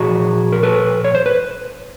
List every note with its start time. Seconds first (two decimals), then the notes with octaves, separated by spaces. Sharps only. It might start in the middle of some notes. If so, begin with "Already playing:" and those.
Already playing: A#2 F3 F#4 G#4
0.52 A#4
0.63 A4 B4
1.04 C#5
1.15 C5
1.26 B4